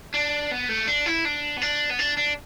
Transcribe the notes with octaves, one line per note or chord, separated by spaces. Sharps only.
D4
B3
A3
D4
E4
D4
B3
D4
B3
D4
D4